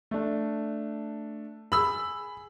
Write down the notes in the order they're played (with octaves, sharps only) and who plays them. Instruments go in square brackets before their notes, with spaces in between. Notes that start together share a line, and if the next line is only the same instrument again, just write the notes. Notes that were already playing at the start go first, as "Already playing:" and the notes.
[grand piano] A3 D4
[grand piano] G#4 [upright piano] B5 E6